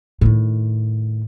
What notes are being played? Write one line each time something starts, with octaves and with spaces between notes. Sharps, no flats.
A2 D#3